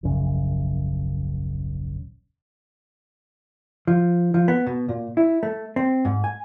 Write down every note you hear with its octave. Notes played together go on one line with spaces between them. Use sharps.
D#1 A#1 F#2 C#3
F3
F3
B3
B2
A#2
E4
A3
C4
G#2
G#5